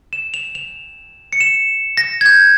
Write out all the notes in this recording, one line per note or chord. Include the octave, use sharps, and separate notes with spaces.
E7
F7
F7
C#7
E7
A#6
G#6
G6